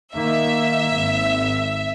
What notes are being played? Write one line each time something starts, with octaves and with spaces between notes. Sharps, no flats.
D#3 A#3 E5
G#1